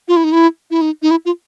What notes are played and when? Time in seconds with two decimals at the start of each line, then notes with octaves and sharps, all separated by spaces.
0.08 F4
0.16 E4
0.24 D#4
0.32 E4
0.71 E4
0.81 D#4
1.02 D#4
1.11 E4
1.25 F4